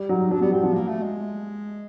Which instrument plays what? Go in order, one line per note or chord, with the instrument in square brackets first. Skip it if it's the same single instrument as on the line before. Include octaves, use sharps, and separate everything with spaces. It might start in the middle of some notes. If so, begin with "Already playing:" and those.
Already playing: [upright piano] G3
[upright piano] F#3 [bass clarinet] D#4
[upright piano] F#3 [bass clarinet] D4
[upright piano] G3 [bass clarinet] B3
[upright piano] F#3 [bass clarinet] C4
[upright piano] F3 [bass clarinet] B3
[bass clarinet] A#3
A3
G#3